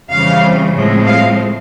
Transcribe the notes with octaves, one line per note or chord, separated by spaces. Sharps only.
F2 C#3 E3 G3 C4 F5
A2 F3 G#3 C4
F5